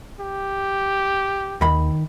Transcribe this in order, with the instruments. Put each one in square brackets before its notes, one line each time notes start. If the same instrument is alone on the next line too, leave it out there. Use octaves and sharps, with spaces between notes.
[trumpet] G4
[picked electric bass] D#2 [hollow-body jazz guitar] D#3 B5